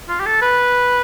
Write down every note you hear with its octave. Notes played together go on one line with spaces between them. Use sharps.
F4
G4
A4
B4